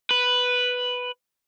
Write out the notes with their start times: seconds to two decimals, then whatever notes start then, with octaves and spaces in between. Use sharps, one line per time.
0.11 B4